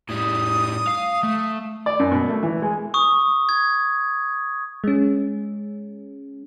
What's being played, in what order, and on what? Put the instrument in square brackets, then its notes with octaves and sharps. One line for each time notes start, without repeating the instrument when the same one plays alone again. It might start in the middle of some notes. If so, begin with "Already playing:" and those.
[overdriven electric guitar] A2 G3 [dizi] D#6
[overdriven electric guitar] F5
A3
[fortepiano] D5
F#2
B2
A3
E3
G#3
[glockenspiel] C#6 D#6
G#6
[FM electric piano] G#3 C#4